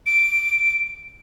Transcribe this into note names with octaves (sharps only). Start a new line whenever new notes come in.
D7